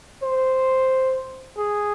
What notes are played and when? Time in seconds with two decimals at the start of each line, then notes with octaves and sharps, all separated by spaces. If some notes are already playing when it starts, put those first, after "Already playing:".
0.23 C5
1.58 G#4